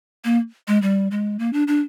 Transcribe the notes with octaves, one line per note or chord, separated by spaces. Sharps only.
A#3
G#3
G3
G#3
A#3
D4
D4